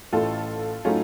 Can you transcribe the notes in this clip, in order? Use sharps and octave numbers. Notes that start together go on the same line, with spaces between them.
A1 A2 A3 F4 A4
A2 F#3 A3 C#4 D#4 F4